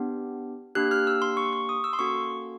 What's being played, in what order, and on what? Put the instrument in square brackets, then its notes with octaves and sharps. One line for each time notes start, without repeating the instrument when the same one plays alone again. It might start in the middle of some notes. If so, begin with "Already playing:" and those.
Already playing: [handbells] B3 D4 G4
A#3 D4 G4 F#6
F6
E6
C6
C#6
C#6
D#6
E6
C6
A#3 C#4 F#4 A4 C#6